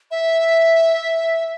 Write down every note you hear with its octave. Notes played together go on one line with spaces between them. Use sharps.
E5